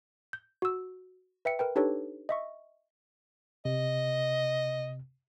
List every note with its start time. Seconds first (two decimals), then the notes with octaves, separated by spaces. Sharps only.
0.33 G6
0.62 F#4 E6
1.45 B4 E5 G5 C#7
1.59 A#4 B4 G5
1.76 D4 D#4 G4 A4 B4 C#5
2.29 D#5 E5 C#6
3.65 C3 D#5